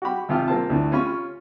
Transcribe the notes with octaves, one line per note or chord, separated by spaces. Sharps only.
F#4 G4 B5
G#1 C3 F4 G4 F6
A#3 C4 F4 A5
D2 A2
C#4 F4 B5 C#6